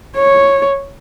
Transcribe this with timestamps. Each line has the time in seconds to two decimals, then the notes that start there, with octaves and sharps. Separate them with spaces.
0.16 C#5